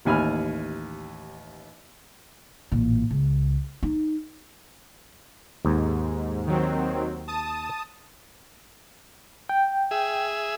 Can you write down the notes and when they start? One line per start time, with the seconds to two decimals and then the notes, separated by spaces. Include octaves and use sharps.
0.05 A1 D#2 G#5 B5 F6
2.72 A1 A#2
3.11 C#2
3.83 D#4
5.65 D#2 G#2
6.47 D#3 F#3 C4
7.28 A5 D#6
9.49 G5
9.91 G#4 E5